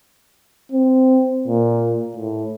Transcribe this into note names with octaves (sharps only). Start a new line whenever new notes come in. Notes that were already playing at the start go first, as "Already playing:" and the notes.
C4
A#2
A2